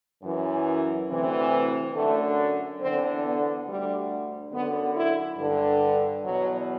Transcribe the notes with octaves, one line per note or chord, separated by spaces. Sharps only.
F#2 E3
D2 C3 E3
F#2 D3 A3
E2 D3 C4
B3
D2 D3 G3
F#2 D3 B3
E4
G2 D3
E2 B2 F#3